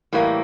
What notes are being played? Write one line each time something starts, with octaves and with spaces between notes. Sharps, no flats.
A2 E3 G3 A#3